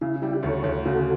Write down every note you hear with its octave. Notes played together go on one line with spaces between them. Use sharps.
C#3 E4
G3 E4 G4
D2 A4 C#5
D2
C#3 F#4 A4